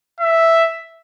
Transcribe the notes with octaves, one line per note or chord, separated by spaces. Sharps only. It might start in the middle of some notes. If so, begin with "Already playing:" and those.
E5